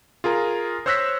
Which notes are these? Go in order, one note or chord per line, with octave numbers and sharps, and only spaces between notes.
F4 G#4 A#4 A#5
C5 C#5 E6 F#6 A#6 B6